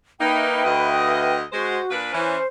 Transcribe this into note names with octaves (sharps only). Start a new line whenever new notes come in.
A#3 D#4 B4 E5 G5
D2 D#5
G#3 F#4 C5
A#2 D4 B4
E3 C#4 C5